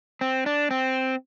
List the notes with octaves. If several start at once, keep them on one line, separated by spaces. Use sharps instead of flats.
C4
D4
C4